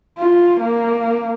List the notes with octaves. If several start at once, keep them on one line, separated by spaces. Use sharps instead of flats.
F4
A#3